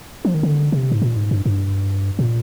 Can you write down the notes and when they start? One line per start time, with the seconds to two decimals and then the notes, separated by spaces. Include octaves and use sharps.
0.25 F3
0.34 D#3
0.43 D3
0.72 C3
0.92 G#2
1.02 A#2
1.17 G#2
1.31 G2
1.46 G2
2.19 A#2